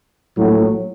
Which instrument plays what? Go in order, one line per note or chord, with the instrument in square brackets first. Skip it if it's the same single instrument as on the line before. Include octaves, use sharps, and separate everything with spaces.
[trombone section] A#1 A2 F#3